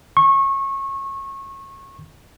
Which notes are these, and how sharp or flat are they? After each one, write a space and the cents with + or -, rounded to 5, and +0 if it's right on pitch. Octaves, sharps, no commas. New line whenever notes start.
C#6 -25